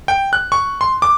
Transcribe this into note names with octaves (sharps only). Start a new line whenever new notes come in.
G5
F#6
C#6
C6
D6